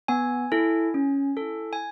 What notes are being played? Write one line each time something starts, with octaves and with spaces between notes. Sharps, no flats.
B3 G#5
E4 A4
C#4
E4 A4
G#5